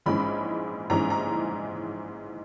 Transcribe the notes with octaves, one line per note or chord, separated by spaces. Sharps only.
A#1 G#2 E3 G#3 C#4 B5
A#1 G#2 E3 G#3 C#4 A#5
A#5